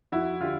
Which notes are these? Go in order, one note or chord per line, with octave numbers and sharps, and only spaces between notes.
F2 E4 F#4
D3 F4 G4